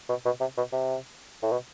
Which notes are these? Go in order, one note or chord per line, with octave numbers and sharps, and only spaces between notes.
B2
B2
C3
B2
C3
A2
B2